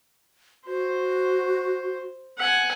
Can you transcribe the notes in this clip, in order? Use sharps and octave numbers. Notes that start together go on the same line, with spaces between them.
F#4 C5
F#5 G#5